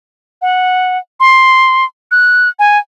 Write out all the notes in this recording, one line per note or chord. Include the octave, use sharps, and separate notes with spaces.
F#5
C6
F#6
G#5